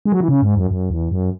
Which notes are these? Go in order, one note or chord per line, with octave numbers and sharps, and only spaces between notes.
G#3
F#3
E3
C#3
G#2
F#2
F#2
E2
F#2